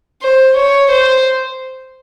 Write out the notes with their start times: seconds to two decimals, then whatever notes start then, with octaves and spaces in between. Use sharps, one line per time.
0.23 C5
0.57 C#5
0.91 C5